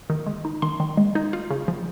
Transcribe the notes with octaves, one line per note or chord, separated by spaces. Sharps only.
D#3
G#3
D#4
D#3 C6
D#3
G#3
D#4
F4
C#3
F3